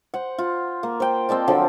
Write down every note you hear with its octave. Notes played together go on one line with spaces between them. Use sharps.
C5 F#5
F4
A#3
C5 G5
C4 D5 D#5 A5
D3 F3 F#3